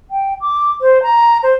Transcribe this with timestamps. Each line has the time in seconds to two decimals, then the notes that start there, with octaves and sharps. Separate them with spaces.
0.11 G5
0.41 D6
0.81 C5
1.03 A#5
1.43 C5